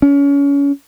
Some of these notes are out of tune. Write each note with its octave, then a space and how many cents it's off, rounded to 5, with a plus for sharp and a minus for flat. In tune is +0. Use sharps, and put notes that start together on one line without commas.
C#4 +30